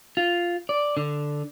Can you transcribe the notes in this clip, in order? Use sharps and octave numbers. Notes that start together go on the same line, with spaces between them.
F4
D5
D3